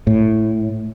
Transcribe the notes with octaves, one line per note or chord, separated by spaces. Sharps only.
A2